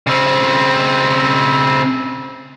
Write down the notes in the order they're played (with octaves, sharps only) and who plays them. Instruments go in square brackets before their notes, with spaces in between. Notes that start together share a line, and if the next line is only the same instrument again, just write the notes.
[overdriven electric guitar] C#3 C4